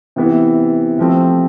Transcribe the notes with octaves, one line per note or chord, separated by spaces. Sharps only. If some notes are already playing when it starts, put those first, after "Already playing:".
C3 E3 B3 E4 B4
C3 F3 A3 C4